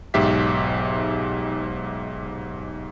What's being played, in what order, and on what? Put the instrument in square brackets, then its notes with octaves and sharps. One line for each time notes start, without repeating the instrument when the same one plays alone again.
[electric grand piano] B1 G#2 G4 E5 B6